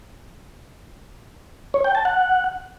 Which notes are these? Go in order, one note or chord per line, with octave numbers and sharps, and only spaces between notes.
C#5
G5
A5
F#5